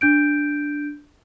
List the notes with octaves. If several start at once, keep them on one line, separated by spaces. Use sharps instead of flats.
D4 G6 D7